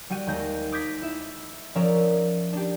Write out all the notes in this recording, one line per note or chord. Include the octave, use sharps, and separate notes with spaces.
G3 F#4 G5 D#7
D#2 G#3 G6 A#6
D6 D#6 G6 G#6 A#6 B6
E4 E5
F3 C#4 G#4 A#4 D5 E5
D4 G4